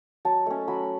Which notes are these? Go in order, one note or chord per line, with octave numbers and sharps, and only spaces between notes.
F#3 A5
A3 C#4
F#3 B5